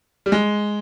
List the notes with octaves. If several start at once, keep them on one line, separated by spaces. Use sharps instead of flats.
G3
G#3